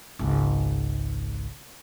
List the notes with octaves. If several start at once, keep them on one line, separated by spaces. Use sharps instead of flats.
G#1 C#2